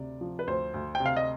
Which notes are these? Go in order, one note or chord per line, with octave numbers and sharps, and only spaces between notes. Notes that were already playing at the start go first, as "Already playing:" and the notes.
Already playing: D2 C3 D5
F3
B4
D2 C5
D2
G5
C3
F5
D#5